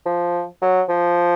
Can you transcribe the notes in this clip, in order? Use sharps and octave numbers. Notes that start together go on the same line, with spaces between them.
F3
F#3
F3